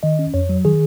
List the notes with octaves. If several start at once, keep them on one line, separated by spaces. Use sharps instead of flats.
D#3 D#5
C#4
F2 C#5
F#3
D#3 G#4